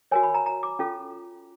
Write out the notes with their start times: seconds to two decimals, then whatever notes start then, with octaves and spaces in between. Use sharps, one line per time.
0.11 F#4 A#4 C#5 G#5
0.23 B5
0.34 A#5
0.46 A#5
0.63 D6
0.79 C#4 F4 A4